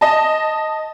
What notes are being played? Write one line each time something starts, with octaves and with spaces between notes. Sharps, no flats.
D#5 A5